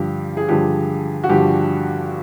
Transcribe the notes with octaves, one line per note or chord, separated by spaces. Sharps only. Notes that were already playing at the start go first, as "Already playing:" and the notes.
Already playing: G2 D3 F3 G4
G#4
G2 D3 F3 G4
F#4
G2 D3 F3 G4